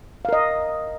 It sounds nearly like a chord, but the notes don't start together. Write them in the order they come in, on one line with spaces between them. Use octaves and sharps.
F5 A#4 D#5